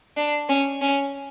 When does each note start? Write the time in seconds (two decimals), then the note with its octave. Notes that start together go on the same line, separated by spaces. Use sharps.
0.17 D4
0.49 C#4
0.81 C#4